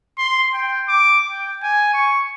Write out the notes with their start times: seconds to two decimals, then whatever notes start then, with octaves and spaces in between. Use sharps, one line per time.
0.18 C6
0.54 G5
0.88 D6
1.30 G5
1.63 G#5
1.94 C#6